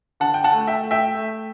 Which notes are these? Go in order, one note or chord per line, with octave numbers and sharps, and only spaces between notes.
D3 F#5 A5
G5
F#5 A5
A3
E5 G5
A3
E5 G5
A3